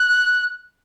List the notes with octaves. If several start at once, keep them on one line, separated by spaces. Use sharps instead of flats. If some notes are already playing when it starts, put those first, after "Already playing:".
Already playing: F#6